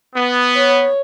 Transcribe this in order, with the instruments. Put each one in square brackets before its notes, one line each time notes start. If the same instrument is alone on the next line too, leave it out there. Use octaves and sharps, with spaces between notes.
[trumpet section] B3
[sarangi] C#5